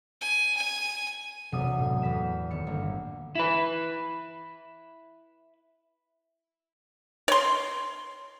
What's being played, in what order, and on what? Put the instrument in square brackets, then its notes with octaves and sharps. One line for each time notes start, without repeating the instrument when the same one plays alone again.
[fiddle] G#5
G#5
[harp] E1 B1 C3 F#4 B4 D#6
A2
E2 B4 B6 E7
D#1 B3 C#7
G1 A#3
[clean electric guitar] E4 B4
[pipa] C#5 C6